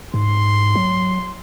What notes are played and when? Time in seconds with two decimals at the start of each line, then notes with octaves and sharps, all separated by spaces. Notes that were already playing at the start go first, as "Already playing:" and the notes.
0.14 G#2 C6
0.75 F#3